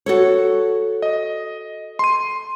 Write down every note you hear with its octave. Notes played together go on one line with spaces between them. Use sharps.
F#4 A4 C#5
D#5
C6 D#7